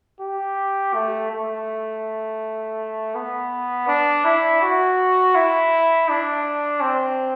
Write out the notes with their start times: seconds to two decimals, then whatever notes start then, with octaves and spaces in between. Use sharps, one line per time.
0.21 G4
0.94 A3
1.31 A3
3.15 B3
3.88 D4
4.25 E4
4.62 F#4
5.35 E4
6.09 D4
6.82 C4